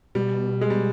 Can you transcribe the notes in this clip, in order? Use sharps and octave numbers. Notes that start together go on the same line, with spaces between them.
B2 G3
G#3
G3